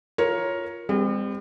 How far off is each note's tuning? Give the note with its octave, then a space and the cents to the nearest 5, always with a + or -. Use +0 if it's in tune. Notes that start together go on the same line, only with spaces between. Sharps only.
F4 +0 A#4 +10 C#5 +0
G3 +45 C4 -20